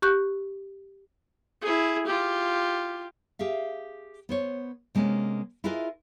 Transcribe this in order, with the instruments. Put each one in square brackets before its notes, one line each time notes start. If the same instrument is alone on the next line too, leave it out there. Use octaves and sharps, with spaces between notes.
[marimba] G4 C#6 F#6 G6
[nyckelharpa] E4 G#4
F4 G4
[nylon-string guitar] G4 G#4 E5 F5
B3 C5 C#5
C3 G#3 A#3 B3 C#4
E4 F4 G#4 A#4 B4 D#5